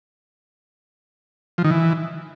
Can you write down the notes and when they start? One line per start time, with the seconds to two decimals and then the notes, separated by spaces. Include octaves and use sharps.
1.58 F3
1.64 D#3
1.71 E3